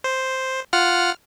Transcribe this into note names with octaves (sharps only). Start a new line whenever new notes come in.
C5
F4 F#5 F6